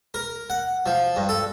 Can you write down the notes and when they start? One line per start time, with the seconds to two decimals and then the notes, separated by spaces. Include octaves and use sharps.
0.14 A#4
0.50 F#5
0.86 F3
1.16 G2
1.29 A4